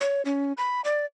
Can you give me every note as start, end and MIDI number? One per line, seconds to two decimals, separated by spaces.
0.01 0.22 73
0.25 0.53 61
0.57 0.81 83
0.84 1.05 74